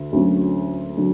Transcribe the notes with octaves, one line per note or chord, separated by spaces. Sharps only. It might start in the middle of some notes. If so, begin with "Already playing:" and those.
Already playing: D2 D3
D2 D3 F#3 C#4
D3 F#3